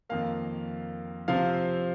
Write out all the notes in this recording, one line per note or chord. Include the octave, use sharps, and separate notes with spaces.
F2 D#3 A#3 F5
C3 F3 C4 F5